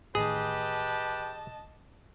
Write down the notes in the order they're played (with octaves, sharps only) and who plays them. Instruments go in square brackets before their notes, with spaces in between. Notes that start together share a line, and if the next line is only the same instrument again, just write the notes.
[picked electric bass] A1 A2 D#3 [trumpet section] G4 B4 [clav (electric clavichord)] G#4 [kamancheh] D#5 A5